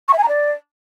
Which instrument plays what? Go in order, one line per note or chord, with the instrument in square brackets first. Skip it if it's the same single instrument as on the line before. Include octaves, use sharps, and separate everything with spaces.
[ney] C#6
E5
G#5
A#5
D5